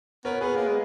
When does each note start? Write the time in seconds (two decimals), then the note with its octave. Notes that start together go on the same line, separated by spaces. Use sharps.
0.25 B3 A#4 C#5
0.41 B3 G#4 B4
0.56 A#3
0.67 G#3